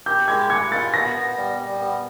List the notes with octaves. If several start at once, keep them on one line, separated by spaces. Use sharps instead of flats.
G4 G6
G#3 G#6
F#5 G#6
F4 A6
B3 A#6
B3
G3
G3
B3